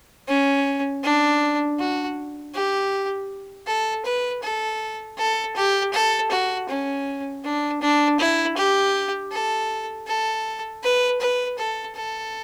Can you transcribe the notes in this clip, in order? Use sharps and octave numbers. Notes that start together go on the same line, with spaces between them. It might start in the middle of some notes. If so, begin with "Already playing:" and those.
C#4
D4
F#4
G4
A4
B4
A4
A4
G4
A4
F#4
C#4
D4
D4
E4
G4
A4
A4
B4
B4
A4
A4